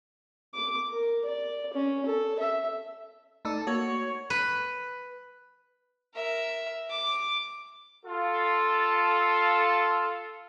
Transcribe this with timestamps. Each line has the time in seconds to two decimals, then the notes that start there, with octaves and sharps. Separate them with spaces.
0.54 D6
0.90 A#4
1.25 D5
1.73 C#4
2.06 A4
2.40 E5
3.45 A3 D#4 A4 D5
3.67 A#3 F#4 C#5
4.30 B4
6.14 A#4 E5
6.90 D6
8.06 F4 A4